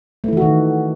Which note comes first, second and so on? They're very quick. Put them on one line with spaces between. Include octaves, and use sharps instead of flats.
A3 E4 E3 F#4 D#3